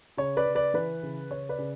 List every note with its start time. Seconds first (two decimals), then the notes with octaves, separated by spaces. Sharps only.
0.17 C#3 C#5
0.37 B4 D5
0.46 C#3
0.55 B4 D5
0.74 E3 B4
1.03 C#3
1.31 C#3 C#5
1.49 B4 D5
1.58 C#3